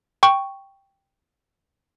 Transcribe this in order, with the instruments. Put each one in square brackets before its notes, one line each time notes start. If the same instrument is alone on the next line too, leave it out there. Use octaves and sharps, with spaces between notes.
[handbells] G5 C#6